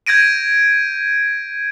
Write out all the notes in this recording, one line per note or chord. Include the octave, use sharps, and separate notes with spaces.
G6 G#6 A#6 D7 D#7